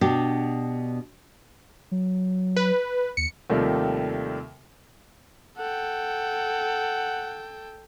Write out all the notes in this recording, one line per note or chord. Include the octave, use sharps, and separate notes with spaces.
B2 D4 G4
F#3
B4
D#2 C#7
D#2 C3 D#3 F3 G3 A3
A4 F#5 G5